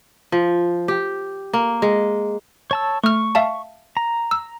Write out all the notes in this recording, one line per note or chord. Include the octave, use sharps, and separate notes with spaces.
F3
G4
A#3
G#3
C#5 A5 E6
A3 C#6 F6
E5 F5 A5
A#5
E6